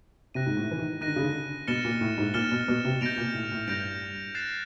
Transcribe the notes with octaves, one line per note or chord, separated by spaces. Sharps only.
C3 F#6 A#6 D#7
G#2
A2
E3
D#3
D#3 F#6 A#6 D#7
D3
C#3
D3
B2 F6 A6 C#7 E7 G7
A#2
A2
G#2
A#2 F6 A6 C#7 E7 G7
B2
B2
C3
B2 G6 A#6 D7 F7
A#2
A2
A2
G2 G6 A#6 D7 F7
F#6 A6 C7 E7